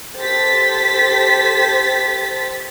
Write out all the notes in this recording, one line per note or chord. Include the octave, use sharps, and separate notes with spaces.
G4 A4 C5 A6 B6